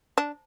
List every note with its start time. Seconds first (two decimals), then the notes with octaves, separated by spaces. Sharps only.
0.18 D4